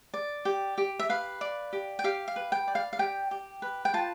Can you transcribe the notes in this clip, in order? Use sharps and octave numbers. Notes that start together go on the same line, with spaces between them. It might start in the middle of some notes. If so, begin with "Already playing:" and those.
D5
G4
G4
E5
B4 F5
D5
G4
G5
G4 F5
F5
B4
G5
D5
F5
F5
G4 G5
G4
B4
G5
F4 A5